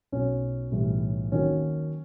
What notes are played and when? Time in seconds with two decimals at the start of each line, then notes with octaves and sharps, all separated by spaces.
0.12 B1 B2 F#3 C#4
0.71 B1 A2 E3 G3
1.32 D#2 D#3 F#3 C#4